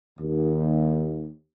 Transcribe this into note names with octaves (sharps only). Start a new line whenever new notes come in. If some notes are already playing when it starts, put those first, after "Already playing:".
D#2